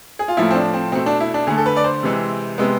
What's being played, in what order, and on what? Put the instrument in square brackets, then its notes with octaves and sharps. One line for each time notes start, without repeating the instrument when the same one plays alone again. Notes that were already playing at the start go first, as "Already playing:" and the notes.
[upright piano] G#4
F4
A2 F3 A3 E4
C4
D4
C4
B2 A3 C4
D4
E4
D4
D3 A3 G#4
A4
B4
D5
C5
C3 E3 G#3
C3 G#3 B3